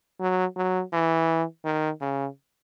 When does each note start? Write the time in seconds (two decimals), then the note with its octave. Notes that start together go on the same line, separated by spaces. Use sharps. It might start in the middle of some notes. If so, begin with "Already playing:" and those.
0.20 F#3
0.56 F#3
0.93 E3
1.65 D#3
2.01 C#3